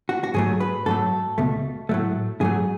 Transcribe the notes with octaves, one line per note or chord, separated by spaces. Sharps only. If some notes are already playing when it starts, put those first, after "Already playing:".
F#4
F#4
G#2 F#3 A3 G#4
B4
G#2 F#3 A3 A4
C#2 B2 A3
A2 F#3 A3
G#2 F#3 A3 G#4